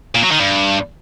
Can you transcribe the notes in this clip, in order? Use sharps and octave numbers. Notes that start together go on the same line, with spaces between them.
A#2
F#3
D#3
G2